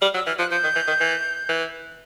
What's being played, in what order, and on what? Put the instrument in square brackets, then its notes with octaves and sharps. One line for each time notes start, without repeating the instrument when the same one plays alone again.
[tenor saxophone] G3 [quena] F6
[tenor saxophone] F#3 [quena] E6
[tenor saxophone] E3 [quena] F6
[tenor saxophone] F3 [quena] F#6
[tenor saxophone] F3 [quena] G6
[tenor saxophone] D#3
E3
D#3
E3
E3